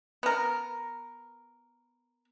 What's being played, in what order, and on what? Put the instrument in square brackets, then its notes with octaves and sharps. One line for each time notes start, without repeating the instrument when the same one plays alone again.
[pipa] B3 A#4